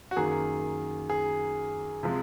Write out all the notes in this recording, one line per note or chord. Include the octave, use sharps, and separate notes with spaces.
F#4
F#2 D#3 A#3 G#4
G#4
C3 F3 G#3